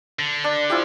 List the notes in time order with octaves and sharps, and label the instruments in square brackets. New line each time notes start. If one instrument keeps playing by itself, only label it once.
[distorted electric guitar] D3
[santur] D4
F3 E4 G4